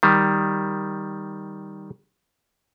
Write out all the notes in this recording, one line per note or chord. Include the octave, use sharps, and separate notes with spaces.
D#3 G3